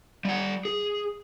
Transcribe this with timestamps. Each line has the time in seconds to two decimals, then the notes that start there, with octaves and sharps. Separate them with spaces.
0.25 G3 F#5
0.65 G#4